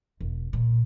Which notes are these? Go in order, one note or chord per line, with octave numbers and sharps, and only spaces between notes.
E1
A#2